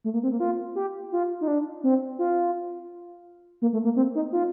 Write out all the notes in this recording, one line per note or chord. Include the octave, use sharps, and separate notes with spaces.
A3
A#3
C4
A#3
F4
G4
F4
D#4
D4
C4
F4
A#3
A3
A#3
C4
D#4
F4